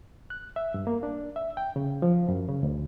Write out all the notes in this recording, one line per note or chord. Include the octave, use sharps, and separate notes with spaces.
F#6
E5
G2
A#3
D4
E5
G5
C#3
F3
F#2
C#3
D2